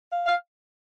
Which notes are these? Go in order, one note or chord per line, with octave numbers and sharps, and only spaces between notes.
F5
F5